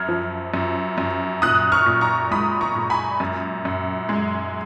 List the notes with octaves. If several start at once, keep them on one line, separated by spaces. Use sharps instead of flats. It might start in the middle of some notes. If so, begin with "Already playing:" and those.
Already playing: F#2 F6 G#6
F3
F#2
F#2
A#2 D#6 F#6
C#6 F6
A#2
A#5 C#6
G#3 B5 D#6
A#5 C#6
A#2
G#5 B5
F#2
F#2
G#3